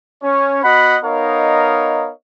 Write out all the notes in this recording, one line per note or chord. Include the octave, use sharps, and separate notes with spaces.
C#4 C#5
B3 F#4 D#5 F#5 B5
B3 D#4 A#4 C#5 D#5 F5